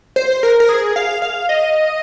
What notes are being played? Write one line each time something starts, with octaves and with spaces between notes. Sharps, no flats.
C5
A#4
A#4
G#4
F5
F5
D#5